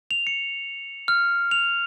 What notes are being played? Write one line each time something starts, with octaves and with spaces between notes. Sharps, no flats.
F7
C#7
F6
F7